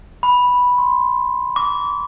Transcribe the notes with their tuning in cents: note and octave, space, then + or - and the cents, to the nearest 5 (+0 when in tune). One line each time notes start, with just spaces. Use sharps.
B5 -5
C6 +0
D6 -40